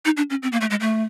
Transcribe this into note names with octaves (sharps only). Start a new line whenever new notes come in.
D#4
D4
C#4
C4
A#3
A3
G#3
A3